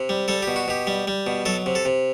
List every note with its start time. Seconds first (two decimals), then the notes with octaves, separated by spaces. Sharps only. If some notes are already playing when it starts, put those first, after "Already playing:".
Already playing: C3
0.09 G3
0.28 G3 A4
0.42 G4
0.48 B2
0.56 F#4
0.68 B2 G4
0.87 G3
1.07 G3
1.27 B2
1.46 F#3 A4
1.66 C3
1.75 A4
1.85 C3